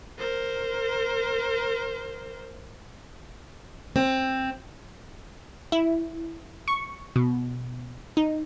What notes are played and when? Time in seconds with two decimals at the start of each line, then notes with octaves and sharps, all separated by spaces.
0.18 A#4 C5
3.96 C4
5.72 E4
6.68 C#6
7.16 B2
8.17 D#4